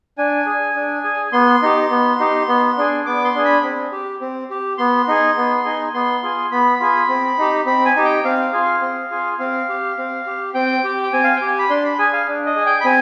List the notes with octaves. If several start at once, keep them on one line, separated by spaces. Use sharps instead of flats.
D4 G#5
G#4
D4
G#4
B3 C6
D#4 G4
B3
D#4 G4
B3
D4 G#4
B3 D6
C6
D4 G#4
B5
C4
G4
C4
G4
B3 C6
D#4 G#4
B3
D#4 G#4
B3 C6
F4 G#4
B3 B5
F4 G#4
C4
D#4 G4
C4 B5
G#5
D#4 G4
G5
C4 F5
F4 G#4
C4
F4 G#4
C4 F5
G4
C4
G4
C4 G5
G4
G5
C4 G#5
F5
G5
G4
G#5
B5
D4 C6
B5
G#4 G#5
F5
D4
D#5
G#4
G5
B5
C4 G#5